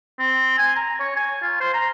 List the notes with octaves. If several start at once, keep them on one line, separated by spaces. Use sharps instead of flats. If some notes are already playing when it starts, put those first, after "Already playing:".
C4
G#5
A#5
C#5
G#5
F4
C5
A#5